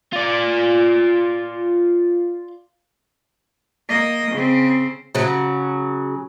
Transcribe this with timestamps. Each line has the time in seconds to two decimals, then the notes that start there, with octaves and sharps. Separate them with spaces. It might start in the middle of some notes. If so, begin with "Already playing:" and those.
0.13 F4 D5
3.89 A#3 D#5
4.32 C#3 C4
5.15 C#3 F#3